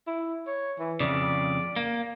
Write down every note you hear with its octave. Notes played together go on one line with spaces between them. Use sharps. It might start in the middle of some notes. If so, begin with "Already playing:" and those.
E4
C#5
E3
F2 C#3 D5
A#3